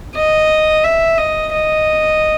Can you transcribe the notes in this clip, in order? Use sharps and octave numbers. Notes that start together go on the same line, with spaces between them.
D#5
E5
D#5
D#5